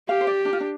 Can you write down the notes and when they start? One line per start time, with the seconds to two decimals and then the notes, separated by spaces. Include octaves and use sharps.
0.09 G4 F5
0.21 C5
0.27 D5
0.45 D4
0.53 F4
0.60 D4